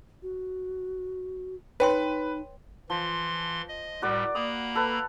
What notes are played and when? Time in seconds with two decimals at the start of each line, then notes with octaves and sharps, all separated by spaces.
0.23 F#4
1.80 D#4 B4 C#5 G5 C6
2.90 E3 F3 C6
3.68 D#5
4.02 A2 G3 F#4 A#4 D5
4.35 A#3 A#5 B5 D#6
4.75 A4 B4